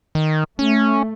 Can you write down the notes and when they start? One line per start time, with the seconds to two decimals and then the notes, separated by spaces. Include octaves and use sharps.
0.15 D#3
0.59 A3 C#4